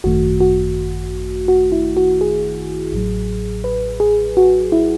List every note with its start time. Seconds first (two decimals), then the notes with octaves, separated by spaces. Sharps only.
0.04 G#1 F#2 D#3 A3 F#4
0.41 F#4
1.48 F#4
1.72 E4
1.97 F#4
2.21 G#4
2.93 A1 A2 F#3
3.64 B4
4.00 G#4
4.37 F#4
4.72 E4